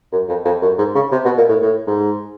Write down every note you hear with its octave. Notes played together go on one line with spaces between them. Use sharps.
F#2
F2
F2
F#2
G#2
C#3
C3
B2
A#2
A2
A2
G#2